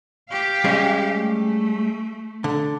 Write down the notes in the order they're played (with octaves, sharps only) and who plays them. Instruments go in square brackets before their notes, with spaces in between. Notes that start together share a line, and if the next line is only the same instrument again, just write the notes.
[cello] G4 F5
[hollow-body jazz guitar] G3 G#3 C#4
[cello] A3
[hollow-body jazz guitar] D3